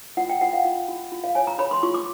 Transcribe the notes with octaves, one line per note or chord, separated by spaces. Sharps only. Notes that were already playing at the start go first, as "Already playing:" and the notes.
F4 F#5
G5
F4 F#5
F5
F4
F4
F4
F5
C#5 G#5
A#5
C#5 B5
C6
F4 C#6
D6